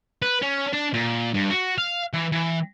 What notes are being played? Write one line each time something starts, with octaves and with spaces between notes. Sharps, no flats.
B4
C#4
D4
A#2
G2
F#4
F5
E3
E3